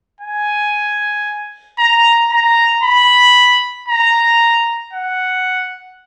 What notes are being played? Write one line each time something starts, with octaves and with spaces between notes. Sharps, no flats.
G#5
A#5
A#5
B5
A#5
F#5